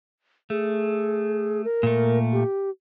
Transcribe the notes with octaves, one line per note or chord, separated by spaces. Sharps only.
A3 G#4
A#4
A#2 A3
G4